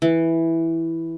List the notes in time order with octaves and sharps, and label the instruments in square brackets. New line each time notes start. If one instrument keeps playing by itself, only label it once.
[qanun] E3